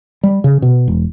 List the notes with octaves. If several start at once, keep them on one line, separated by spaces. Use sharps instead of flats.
G3
C#3
B2
E1